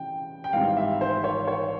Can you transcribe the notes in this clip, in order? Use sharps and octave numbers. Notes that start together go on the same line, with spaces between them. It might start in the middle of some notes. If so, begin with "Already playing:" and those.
Already playing: C#3 E3 G5
G5
G#1 G#2 E3 G3 F5
E5
C5
C#5
C#5